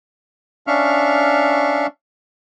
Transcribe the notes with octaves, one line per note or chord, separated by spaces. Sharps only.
C#4 D4 E5 F5 C#6 F6